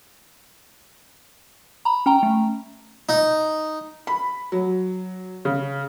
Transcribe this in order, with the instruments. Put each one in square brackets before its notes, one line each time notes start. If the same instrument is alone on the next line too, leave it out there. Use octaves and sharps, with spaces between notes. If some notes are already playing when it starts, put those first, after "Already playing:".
[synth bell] A#5 B5
C#4 G5 A#5
A3
[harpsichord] D#4
[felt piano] B5
F#3
C#3